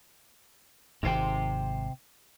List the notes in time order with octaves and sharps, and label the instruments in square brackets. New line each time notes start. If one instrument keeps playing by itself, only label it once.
[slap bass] G#1 G#2 [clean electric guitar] C3 C5 G5